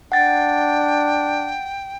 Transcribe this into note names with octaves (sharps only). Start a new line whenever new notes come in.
D4 F#5 G5 A6